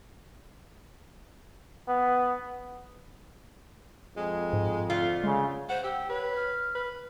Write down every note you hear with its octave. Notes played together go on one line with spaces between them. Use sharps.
B3
F2 G#3
G#2
D3 A3 F4
C#3 G#3
C5 F#5
G4 E6
B4 C#5
F6
B4